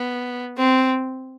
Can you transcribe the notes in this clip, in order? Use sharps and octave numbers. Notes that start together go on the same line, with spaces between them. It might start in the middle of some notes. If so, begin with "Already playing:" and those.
Already playing: B3
C4